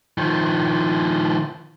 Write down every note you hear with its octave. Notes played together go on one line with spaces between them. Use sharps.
D#3 F3